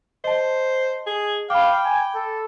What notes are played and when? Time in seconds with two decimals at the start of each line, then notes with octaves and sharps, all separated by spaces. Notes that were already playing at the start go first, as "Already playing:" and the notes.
0.24 C5 D#5 A5
1.06 G#4
1.50 F5 G5 B5 D6
1.85 G#5
2.15 A4